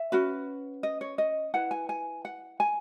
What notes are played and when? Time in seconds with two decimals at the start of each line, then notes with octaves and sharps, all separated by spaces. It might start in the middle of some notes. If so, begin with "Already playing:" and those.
Already playing: E5
0.12 C#4 F#4 B4
0.83 D#5
1.01 C#5
1.18 D#5
1.54 E4 B4 F#5
1.71 G#5
1.89 G#5
2.25 F#5
2.60 G#5